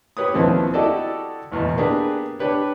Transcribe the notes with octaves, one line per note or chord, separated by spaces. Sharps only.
G4 B4 C#5 D#6
D#2 E3 F3 A3 B3 C4
E4 F#4 G4 A4 D5 D#5
A1 E2 B2
A#3 B3 D4 G4 G#4 B4
D4 G4 B4 C#5